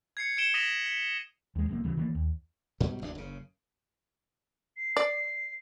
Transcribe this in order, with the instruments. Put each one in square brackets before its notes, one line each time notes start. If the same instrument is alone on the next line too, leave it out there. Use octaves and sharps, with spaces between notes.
[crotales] G#6 C7 C#7
G#6 C#7 D7 E7 G7
D#6 A#6 B6 D#7 F7 F#7
B6
[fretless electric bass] D#2 G#3
F1 F2 A#3
C#2 C#3 E3 F#3
D#3 E3 A3 A#3
D#2
[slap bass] G#2 B2 F#3 G3
F1 D2 D#3 D4
F#1 C#3
[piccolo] C7
[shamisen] D5